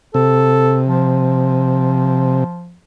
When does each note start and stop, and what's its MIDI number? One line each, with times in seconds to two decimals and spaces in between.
0.14 2.44 48
0.14 0.81 69
0.86 2.76 53